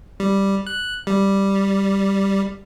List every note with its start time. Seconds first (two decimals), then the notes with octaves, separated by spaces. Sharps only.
0.20 G3
0.67 F#6
1.07 G3